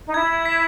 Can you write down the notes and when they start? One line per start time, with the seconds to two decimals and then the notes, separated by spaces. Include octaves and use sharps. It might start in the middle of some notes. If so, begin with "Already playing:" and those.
0.06 D#4
0.14 E4 G#6
0.45 B6